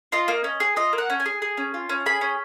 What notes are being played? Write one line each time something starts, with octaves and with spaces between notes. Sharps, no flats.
F4 D#5
A#3
C#4
G#4
F4 D#5
A#3
F#5
C#4
G#5
G#4
G#4
C#4
F4
C#4
G#4 B5
C#4